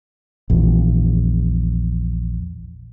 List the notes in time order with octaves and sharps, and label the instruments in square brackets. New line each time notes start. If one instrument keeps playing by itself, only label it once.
[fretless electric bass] A#1 E2